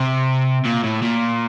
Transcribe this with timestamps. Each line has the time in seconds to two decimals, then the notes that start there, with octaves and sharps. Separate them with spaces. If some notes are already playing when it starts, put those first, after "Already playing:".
Already playing: C3
0.66 A#2
0.84 A2
1.03 A#2